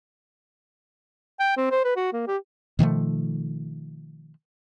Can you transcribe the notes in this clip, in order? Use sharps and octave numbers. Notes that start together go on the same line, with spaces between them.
G5
C4
C5
B4
F#4
A#3
G4
B2 D#3 F3 A3